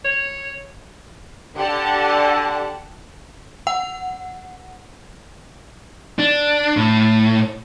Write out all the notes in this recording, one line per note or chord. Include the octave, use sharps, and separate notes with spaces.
C#5
D3 G4 F#5 A5
F#5
D4
A2